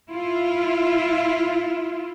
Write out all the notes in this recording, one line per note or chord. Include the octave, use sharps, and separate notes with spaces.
E4 F4